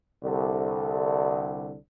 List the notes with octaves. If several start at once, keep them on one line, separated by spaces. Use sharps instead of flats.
C2 D3